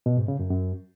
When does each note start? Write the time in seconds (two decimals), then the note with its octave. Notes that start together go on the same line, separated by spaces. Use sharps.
0.06 B2
0.17 G#2
0.28 C#3
0.39 F#2
0.51 F#2